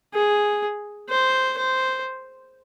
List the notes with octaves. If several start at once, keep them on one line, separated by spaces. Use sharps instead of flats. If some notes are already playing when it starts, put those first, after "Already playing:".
G#4
C5
C5